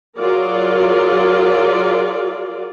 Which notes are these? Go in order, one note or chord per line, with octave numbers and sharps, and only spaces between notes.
F#3 F4 F#4 G#4 A#4 D5